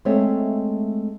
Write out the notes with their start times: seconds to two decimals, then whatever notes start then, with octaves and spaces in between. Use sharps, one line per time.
0.05 G#3 A3 C4 C#5 E5